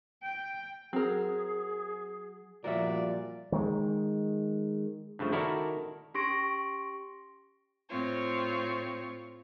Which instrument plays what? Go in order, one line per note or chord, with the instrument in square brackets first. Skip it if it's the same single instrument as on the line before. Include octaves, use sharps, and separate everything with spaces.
[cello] G5
[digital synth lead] F#3 [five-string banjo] C4 A#4 [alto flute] G#4
[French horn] A#2 [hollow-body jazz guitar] F3 G3 A#4 [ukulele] F#4 E5 [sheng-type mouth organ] D5
[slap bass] D#3 G#3
[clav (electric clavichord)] G2 C#3 F3 A3
D#3 E4 F#4 A4 A#4 D5
[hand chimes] C#4 G4 C6 C#6 A#6 D7
[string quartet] A2 C4 F4 C#5